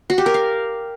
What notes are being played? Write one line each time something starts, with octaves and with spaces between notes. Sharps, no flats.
F#4
G4
A#4
F5